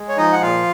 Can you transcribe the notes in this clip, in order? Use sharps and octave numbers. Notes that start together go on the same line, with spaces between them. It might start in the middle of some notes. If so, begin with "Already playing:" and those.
Already playing: G#3
C#5
F3 D#4 D#5
F#5
A#2 F4 F5